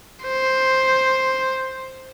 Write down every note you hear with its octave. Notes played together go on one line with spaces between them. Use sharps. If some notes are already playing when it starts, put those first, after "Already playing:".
C5